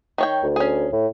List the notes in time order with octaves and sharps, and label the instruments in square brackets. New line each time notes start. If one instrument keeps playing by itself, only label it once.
[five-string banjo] D#3 C#5 G5
[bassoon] D2
[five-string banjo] C#4 G#4
[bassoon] A2